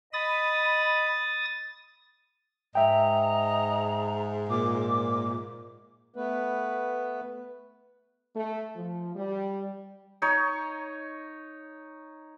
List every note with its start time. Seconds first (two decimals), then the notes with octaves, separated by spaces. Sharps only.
0.13 D#5 B5 D#6 A6
2.75 G#2 D#5 E5 G5 A#5
4.50 A#2 D6
6.16 A3 B3 B4
8.36 A3
8.76 F3
9.16 G3
10.22 D#4 C#5